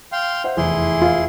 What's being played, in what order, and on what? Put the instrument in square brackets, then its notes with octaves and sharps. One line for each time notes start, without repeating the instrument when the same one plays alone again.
[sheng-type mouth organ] F5 G5 C6
[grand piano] C5 E5 F#5
[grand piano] F1 E2 [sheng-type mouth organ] E4 G#4 C6
[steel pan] F4